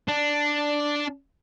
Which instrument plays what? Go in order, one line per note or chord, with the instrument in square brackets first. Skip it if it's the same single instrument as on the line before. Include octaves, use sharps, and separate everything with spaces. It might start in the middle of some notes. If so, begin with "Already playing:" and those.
[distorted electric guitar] D4